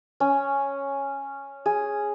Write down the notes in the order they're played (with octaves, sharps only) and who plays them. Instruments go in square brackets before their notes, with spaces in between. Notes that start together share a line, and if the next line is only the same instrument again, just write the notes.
[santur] C#4
G#4